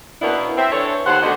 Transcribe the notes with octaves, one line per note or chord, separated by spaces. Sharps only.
B2 A#3 B3 C#4 D4 E4
C4 E5
E3 D4 A4 C#5
D#2 C5 F#5
D3 A3 B3 D4 F#4 D#5